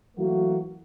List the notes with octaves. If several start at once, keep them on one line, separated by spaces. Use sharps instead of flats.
E3 F#3 A3 A#3 F#4